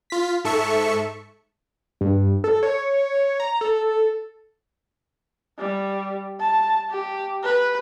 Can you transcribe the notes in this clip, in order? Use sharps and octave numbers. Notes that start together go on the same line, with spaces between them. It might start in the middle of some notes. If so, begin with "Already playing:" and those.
F4 B6
G#2 A4 E5 C#6 C#7
G2
A4
C#5
A#5
A4
G3
A5
G4
B4